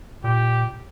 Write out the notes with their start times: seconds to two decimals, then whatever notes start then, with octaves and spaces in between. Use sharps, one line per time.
0.24 A#2 G4